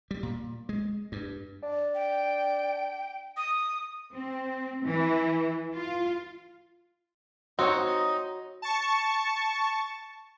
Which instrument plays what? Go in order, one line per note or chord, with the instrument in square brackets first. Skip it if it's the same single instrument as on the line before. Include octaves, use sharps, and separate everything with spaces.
[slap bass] G3
A#2
G#3
G2
[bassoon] D4
[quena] G5
D#6
[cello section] C4
E3
F4
[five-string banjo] C4 [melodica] D#4 D#5 [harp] F#4 C#5
[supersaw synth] A5 C#6